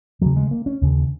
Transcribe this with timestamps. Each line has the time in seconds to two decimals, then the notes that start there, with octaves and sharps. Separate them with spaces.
0.21 D#2 C#3 F#3
0.36 G#3
0.51 A#3
0.66 C#4
0.81 D#2 C#3